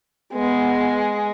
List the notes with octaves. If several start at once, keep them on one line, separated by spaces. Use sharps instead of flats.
G#3 B3